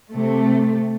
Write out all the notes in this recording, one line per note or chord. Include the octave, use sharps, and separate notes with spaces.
C3 A3